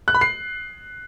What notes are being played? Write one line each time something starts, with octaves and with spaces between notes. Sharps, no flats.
F#6
B5
C7